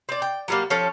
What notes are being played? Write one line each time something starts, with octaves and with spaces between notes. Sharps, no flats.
C4 D5
G5
F#3 G3 A#3
F3 C#4 A4